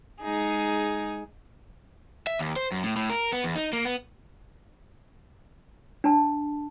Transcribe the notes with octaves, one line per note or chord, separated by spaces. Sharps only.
G#3 D#4 G#4
E5
D#2
C5
F#2
A2
A2
A#4
B3
E2
D#4
A#3
B3
D4 A5